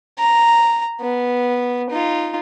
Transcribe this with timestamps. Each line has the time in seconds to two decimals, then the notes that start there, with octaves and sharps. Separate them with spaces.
0.19 A#5
1.01 B3
1.90 D#4 F4